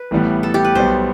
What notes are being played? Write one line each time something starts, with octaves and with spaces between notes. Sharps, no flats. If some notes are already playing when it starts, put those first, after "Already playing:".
Already playing: B4
A1 A2 E3 G3 B3
A4
G4
B4
B1 B2 G3 B3 C5